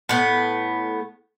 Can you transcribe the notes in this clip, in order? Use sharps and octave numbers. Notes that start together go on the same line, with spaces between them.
A2 B3